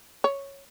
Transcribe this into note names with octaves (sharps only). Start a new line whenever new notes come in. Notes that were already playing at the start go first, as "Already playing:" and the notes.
C#5